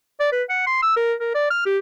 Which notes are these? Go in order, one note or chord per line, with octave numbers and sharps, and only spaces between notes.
D5
B4
F#5
C6
E6
A#4
A#4
D5
F6
G4